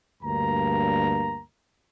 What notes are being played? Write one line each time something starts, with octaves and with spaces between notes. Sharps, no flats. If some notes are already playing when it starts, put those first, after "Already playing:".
D2 G2 A#3 A#5